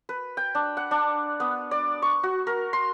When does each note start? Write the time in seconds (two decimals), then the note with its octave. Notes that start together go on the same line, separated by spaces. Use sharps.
0.09 B4
0.37 G5
0.55 D4
0.77 F#5
0.91 D4
1.40 B3
1.71 D5
2.02 C#6
2.23 F#4
2.47 A#4
2.73 C6